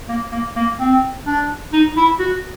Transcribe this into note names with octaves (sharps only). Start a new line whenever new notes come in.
A#3
A#3
A#3
C4
D4
D#4
E4
F#4